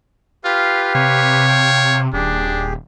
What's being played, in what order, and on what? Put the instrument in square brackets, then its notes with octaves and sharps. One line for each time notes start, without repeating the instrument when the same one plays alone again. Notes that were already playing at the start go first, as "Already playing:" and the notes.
[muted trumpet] F4 [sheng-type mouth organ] G4 B4 F5
[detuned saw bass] C3 [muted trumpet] C#5
[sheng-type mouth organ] F5 G5
[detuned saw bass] D#1 [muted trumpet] D4 [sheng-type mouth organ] G4 G#4